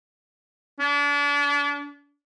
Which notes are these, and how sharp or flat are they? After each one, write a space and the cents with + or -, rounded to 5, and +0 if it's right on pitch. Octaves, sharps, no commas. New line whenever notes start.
D4 -35